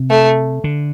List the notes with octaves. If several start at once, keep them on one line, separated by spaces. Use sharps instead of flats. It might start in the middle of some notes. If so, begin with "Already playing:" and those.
Already playing: C3
A3
D3